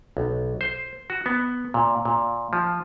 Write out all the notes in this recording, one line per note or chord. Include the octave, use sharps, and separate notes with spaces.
B1
C5
F#4
B3
A#2
A#2
F3